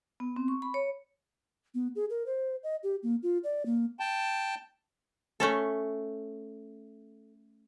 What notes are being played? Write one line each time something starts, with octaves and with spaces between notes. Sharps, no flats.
B3
C4
C#6
B5
C#5
B3
G#4
A#4
C5
D#5
G4
A#3
F4
D5
A#3
G5 A5
A3 C#4 A4